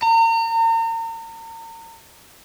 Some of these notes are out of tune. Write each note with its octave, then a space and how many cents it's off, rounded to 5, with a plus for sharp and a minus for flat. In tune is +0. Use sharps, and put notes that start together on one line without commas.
A#5 -40